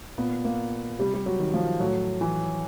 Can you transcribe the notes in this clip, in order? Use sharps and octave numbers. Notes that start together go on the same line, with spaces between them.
A#2 B3
A#3
C3 G3
G3
F#3
D#3
F3
A2 F#3
E3